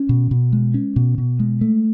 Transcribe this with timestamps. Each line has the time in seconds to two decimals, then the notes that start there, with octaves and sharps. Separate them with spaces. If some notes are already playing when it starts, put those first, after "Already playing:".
Already playing: C#4
0.09 B2
0.31 B2
0.53 G#3
0.74 C#4
0.96 B2
1.18 B2
1.40 G#3
1.61 A3